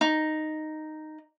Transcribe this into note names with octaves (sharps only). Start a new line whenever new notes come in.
D#4